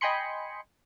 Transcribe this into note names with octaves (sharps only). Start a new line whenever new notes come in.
D#5 G5 G#5 B5 C6 C#7